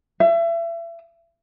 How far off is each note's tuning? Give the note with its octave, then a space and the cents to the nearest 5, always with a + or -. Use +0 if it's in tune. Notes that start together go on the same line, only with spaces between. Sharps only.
E5 +35